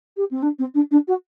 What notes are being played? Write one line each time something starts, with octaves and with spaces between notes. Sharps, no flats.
G4
C4
D4
C4
D4
D4
F#4